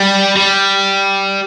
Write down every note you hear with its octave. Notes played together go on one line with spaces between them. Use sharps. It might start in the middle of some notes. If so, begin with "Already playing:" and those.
Already playing: G3
G3